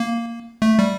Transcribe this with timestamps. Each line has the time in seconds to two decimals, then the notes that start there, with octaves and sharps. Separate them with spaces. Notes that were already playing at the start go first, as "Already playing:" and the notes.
Already playing: A#3
0.62 A3
0.79 G3